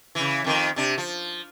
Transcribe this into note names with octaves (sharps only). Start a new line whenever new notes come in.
C#3 E3
F2 D#3
C3 D4
F3